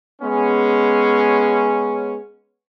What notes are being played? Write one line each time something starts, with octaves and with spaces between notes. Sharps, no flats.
G#3 B3 C#4